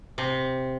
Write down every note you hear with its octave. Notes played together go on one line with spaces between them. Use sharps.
C3